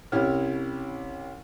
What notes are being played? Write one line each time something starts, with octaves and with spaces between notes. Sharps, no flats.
C2 C#4 E4 G4 C#5 F6